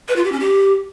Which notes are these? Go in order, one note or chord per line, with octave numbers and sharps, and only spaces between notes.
B4
F4
G4
C#4
G4